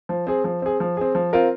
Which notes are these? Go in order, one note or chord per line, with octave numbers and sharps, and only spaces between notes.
F3
C4 G#4
F3
C4 G#4
F3
C4 G#4
F3
C4 F4 A#4